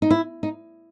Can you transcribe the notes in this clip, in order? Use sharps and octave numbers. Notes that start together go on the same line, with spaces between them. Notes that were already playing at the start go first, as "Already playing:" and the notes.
D#4
E4
D#4